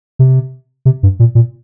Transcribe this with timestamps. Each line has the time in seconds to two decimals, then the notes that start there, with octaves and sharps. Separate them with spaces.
0.19 C3
0.85 C3
1.03 G2
1.19 A#2
1.35 A#2